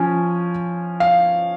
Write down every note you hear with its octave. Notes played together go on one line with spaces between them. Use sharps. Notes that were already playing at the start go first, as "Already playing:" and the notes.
Already playing: F3 C#4 G#5
F5